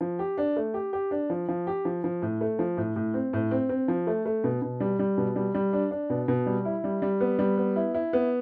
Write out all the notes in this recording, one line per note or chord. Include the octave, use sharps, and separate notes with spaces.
F3
G4
D4
A3
G4
G4
D4
F3
F3
G4
F3
F3
A2
A3
F3
A2
A2
C4
A2
C4
C4
F3
A3
A3
B2
B2
G3
G3
B2
G3
G3
D4
D4
B2
B2
G3
E4
G3
G3
B3
G3
B3
E4
E4
B3